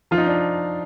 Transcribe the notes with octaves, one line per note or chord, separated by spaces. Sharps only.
F3 F4
D#4
D4